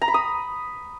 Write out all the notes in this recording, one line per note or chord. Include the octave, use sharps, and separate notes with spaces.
A#5
B5
D#6